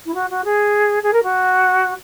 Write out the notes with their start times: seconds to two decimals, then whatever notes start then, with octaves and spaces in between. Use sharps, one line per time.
0.06 E4
0.14 F#4
0.30 F#4
0.45 G#4
1.03 G#4
1.13 A#4
1.23 F#4